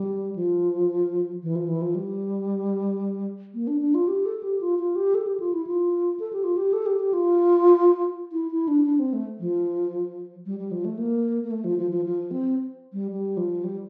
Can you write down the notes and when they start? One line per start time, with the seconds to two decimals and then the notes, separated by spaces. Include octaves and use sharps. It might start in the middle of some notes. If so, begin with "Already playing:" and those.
Already playing: G3
0.35 F3
1.43 E3
1.56 F3
1.68 E3
1.82 F3
1.95 G3
3.54 A#3
3.67 D4
3.81 D4
3.94 F4
4.08 G4
4.26 A4
4.43 G4
4.61 F4
4.79 F4
4.96 G4
5.15 A4
5.27 G4
5.40 F4
5.53 E4
5.67 F4
6.20 A4
6.33 G4
6.44 F4
6.57 G4
6.73 A4
6.86 G4
7.00 G4
7.13 F4
8.32 E4
8.51 E4
8.68 D4
8.86 D4
8.99 C4
9.13 A3
9.40 F3
10.46 G3
10.59 G3
10.71 F3
10.85 A3
10.98 A#3
11.44 A#3
11.51 A3
11.64 F3
11.79 F3
11.91 F3
12.05 F3
12.31 C4
12.93 G3
13.11 G3
13.37 F3
13.64 G3